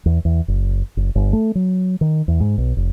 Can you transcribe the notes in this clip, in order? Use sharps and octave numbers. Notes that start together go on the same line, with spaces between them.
E2
E2
F#1
F#1
G1
A3
F#3
D#3
E2
G#2
B1
F1